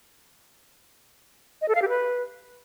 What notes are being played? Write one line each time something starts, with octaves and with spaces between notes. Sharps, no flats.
D#5
A4
F5
G4
B4